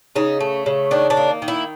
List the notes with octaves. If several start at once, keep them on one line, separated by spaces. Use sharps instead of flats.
C#3 D#4
A3
C#3
D#3 D4
D4
A#3
D#3
E4